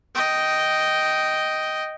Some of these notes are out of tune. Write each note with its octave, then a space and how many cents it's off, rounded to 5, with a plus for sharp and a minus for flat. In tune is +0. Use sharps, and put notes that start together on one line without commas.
D#5 +0 G5 -10